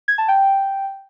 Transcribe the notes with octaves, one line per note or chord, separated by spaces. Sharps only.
G#6
A5
G5